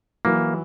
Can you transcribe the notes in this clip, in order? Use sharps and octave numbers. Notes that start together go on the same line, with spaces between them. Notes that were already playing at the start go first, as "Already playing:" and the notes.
E3 F#3 A#3